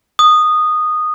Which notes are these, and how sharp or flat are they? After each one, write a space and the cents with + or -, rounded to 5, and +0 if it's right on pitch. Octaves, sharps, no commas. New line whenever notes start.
D#6 -15